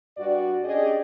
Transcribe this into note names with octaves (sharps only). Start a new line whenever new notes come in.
G2 F#4 D5
C#4 D4 G4 G#4 D5 D#5